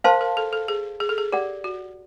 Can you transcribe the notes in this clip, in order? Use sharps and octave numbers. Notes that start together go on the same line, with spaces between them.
A#4 C5 F5 A5 C6
A#4
A4
A4
G#4
G#4
A4
G#4
G4 A#4 D5 F#5
F#4